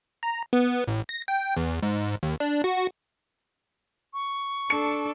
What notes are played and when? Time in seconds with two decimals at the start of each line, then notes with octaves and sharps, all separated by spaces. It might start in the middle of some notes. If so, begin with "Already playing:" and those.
0.23 A#5
0.53 B3
0.88 A1
1.09 A#6
1.28 G5
1.57 E2
1.83 G#2
2.23 D#2
2.40 D4
2.64 F#4
2.76 F#4
4.14 C#6
4.70 D4 A4 C#7